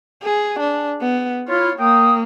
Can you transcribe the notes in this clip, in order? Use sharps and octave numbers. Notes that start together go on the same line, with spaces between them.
G#4
D4
B3
E4 F4 C#5
A#3 G5 D#6